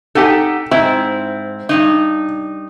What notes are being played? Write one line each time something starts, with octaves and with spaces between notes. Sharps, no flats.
D#4 G4 A4 F#5 G#5
G#2 C4 E4
G2 C#3 D#4